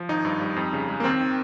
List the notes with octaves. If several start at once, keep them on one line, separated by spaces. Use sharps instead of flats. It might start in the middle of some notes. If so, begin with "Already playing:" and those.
Already playing: F3
G#1 D#4
G2
G3
F2
C#3
G#3
A#3
D#2 C4
D#3